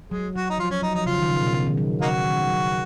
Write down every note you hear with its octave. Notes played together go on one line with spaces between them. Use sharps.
F#3 G#3
F#3 F#4
D#4
F3 F4
F#3 C#4
F#3 D#4
F3 D#4
C#3 F4
D#3
C#3
B2
C#3
D#3
F#3
C#3 A#3 D#4 F#4
D#3
F#3